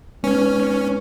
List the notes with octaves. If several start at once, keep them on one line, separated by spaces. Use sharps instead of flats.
G#3 B3 C#4 D#4 B4